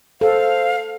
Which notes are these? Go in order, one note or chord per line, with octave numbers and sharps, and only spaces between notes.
A4 C5 F5